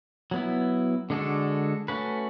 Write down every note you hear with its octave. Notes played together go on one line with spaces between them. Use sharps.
F#3 B3 E4
D3 G#3 D4 F#4 A4
A3 C#4 F#4 B4